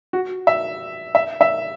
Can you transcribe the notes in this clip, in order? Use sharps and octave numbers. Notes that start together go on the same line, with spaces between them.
F#4
E5
E5
E5